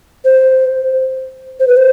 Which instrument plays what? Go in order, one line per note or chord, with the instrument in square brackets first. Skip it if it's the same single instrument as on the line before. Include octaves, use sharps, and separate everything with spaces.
[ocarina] C5
C5
B4
C5